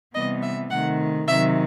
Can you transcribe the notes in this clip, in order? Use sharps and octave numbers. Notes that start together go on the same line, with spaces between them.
C3 E3 G3 B3 D#5
E5
C3 D#3 A3 F#5
C3 D#3 F#3 E5